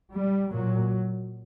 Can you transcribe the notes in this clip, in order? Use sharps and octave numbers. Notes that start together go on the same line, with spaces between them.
G3
A#2 F#3